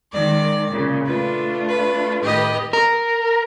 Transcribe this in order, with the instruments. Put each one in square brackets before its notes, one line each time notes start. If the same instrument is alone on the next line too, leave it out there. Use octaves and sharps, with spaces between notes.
[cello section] D#3 G#3 [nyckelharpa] D5
[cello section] A#2 C#3
[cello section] A3 D4 F4 [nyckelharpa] B4
[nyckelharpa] B4
[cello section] A2 D#3 B4 [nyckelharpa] G4 D#5
[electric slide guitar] A#4